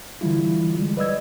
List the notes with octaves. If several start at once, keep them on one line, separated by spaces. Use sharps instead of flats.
D3 E3 G3 E4 F4
G3 G#3
B4 D5 D#5 E6 G#6